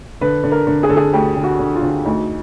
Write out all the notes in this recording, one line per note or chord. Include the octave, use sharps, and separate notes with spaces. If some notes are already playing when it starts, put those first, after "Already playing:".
D3 B4
D3
A#4
D3
G#4
D3 A4
G#4
D2 G4
D3 G4
F#4
D3
F4
D3 F#4
F4
D2 D#4